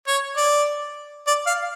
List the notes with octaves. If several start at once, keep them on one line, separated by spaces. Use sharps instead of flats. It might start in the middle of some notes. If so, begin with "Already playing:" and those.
C#5
D5
D5
F5